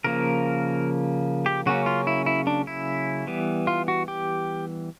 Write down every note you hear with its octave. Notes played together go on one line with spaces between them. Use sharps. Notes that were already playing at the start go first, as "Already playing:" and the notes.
C#3 F3 A#3 A#4
G4
C#3 F#3 A#3 C#4 F#4
F4
E4
E4
D4
E4
E3 G3 B3
F4
F#4
G4